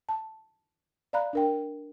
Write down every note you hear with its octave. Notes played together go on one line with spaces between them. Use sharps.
A5
D5 F5 A#5 B5 F#6
D4 A#4 G5